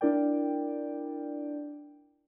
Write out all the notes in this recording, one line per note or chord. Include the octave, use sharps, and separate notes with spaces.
D4 E4 A#4 D5 G5